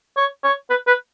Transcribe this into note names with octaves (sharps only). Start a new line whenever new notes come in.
C#5
C#5
B4
B4